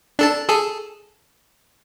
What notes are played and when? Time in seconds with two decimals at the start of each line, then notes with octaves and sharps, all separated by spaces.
0.19 D4 A4 A5
0.49 G#4 A4